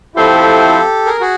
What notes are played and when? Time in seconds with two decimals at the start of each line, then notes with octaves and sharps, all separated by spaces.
0.16 F3 A3 C4 E4 G4 A4
1.06 G#4 A#4
1.21 F#4 G#4